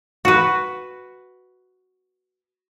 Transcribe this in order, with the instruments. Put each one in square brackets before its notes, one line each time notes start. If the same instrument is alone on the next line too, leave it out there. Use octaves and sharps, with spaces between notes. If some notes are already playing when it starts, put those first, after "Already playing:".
[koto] F#4 B4